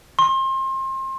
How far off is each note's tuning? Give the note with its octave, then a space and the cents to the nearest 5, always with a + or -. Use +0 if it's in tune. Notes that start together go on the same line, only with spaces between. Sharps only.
C6 +30